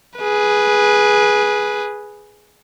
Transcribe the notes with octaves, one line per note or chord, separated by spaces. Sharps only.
G#4 B4